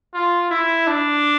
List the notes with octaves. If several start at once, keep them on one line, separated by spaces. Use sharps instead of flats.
F4
E4
D4